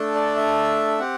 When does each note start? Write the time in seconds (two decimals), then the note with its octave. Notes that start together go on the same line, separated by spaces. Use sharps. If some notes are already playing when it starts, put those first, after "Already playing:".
Already playing: A3 D4 A4
0.15 D5
0.36 E5
0.99 C4 G4 F#5